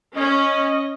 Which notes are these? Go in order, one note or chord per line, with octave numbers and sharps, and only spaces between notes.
C#4 D#5